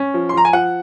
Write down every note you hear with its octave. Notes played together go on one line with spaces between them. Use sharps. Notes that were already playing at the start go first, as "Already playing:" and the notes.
Already playing: C#4
F3
C6
F3 A#5
G#5
F3 F#5